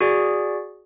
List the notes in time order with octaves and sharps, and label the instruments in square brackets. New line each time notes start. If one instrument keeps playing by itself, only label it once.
[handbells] F#4 G#4 D5